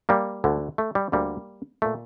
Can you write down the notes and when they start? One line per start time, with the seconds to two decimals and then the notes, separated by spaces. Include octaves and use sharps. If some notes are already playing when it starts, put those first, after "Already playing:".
0.09 G3 A#3
0.44 D2 D3
0.78 A3
0.95 G3
1.12 D2 D3 G3 A#3
1.82 A#2 A3